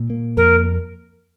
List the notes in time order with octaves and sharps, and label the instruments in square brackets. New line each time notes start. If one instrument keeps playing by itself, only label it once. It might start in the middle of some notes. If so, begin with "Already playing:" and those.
Already playing: [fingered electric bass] A#2
A#3
[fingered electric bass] F2 [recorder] A#4